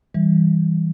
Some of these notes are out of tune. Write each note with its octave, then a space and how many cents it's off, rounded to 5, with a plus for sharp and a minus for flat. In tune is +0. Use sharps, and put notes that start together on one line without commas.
E3 -15 G3 +0